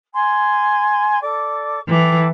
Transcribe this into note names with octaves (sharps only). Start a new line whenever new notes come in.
G#5 C6
A4 D5 D6
E3 A4 G5 D6